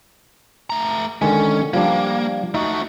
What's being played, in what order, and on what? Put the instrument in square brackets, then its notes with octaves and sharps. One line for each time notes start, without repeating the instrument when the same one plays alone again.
[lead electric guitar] A3 A#5
[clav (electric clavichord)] D3 D#3 G#3 [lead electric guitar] C#4
[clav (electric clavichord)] F3 G3 D4 [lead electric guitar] A#3
[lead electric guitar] A3 F#4 [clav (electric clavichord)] D#4